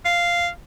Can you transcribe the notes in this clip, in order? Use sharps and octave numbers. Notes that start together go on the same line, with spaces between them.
F5